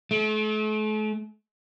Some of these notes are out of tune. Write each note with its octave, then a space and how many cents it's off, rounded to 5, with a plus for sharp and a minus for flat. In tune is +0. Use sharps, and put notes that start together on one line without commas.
A3 -40